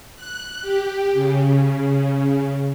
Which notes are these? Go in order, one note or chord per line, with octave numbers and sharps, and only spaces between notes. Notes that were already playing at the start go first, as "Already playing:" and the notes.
F#6
G4
C#3